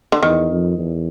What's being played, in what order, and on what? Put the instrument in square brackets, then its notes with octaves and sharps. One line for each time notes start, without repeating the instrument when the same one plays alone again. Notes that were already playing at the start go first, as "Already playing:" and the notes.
[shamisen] D3
[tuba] E2 [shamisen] D#3
[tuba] F2
E2